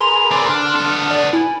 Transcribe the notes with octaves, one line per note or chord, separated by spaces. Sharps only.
G#4 A#4 B4 C6 F7
C4 D4 D6
D3 D4 F6
B3 A4
D5
E4 G#5